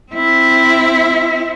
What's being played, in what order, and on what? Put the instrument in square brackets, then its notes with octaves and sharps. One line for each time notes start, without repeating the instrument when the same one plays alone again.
[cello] C4 E4